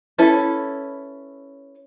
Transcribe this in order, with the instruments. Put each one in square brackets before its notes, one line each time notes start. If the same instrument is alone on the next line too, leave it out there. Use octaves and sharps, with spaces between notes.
[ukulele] C#4 E4 A4 B4